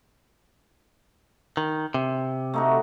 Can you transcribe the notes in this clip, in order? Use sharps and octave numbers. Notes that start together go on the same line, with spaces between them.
D#3
C3
A3 D#4 F#4